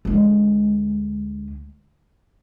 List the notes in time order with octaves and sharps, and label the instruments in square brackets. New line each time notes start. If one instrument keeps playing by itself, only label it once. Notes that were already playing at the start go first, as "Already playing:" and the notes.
[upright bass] D2 G#3